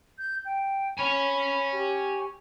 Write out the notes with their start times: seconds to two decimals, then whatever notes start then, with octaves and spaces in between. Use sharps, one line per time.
0.19 G6
0.45 G5
0.98 C#5 G#5 B5
1.72 G4